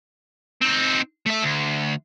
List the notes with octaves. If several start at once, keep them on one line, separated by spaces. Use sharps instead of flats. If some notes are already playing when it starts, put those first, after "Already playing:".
C4 D#4
A3 E5
D2